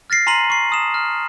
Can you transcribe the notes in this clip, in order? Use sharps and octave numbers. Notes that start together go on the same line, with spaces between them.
F6 A6 A#6 C7
G#5 A#5 C6 B6 D#7 F#7
C#6 C7
A5 D#6 E7
F6